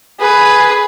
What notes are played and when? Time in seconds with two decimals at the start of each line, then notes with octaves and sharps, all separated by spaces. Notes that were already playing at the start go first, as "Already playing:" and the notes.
0.20 G#4 B4